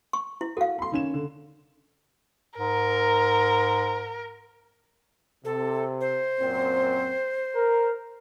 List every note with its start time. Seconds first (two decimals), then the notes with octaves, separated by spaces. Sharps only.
0.13 C#6
0.41 E4
0.57 F#4 A4 F5
0.78 B5 C6
0.92 D#3 C#4 E7
1.14 D3
2.58 G#2 A#4
5.45 C3 A4
6.01 C5
6.39 F#2 A#2 C4
7.54 A#4